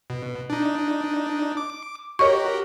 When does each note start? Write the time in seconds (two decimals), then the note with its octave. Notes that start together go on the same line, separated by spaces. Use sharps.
0.10 B2
0.50 D4 D#4
1.57 D6
2.19 F#4 G4 A#4 C#5 D#5 C#6